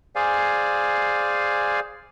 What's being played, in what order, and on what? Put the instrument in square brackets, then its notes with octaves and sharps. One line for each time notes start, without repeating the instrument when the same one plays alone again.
[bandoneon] G#4 C5 D5 F5 G#5